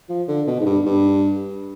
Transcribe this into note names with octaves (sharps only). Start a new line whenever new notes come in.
F3
D3
B2
G#2
G2
G2